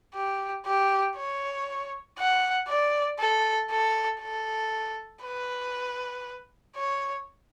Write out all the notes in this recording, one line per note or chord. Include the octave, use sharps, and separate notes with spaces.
G4
G4
C#5
F#5
D5
A4
A4
A4
B4
C#5